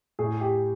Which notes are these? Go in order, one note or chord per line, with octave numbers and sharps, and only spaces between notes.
A2 G#4
G4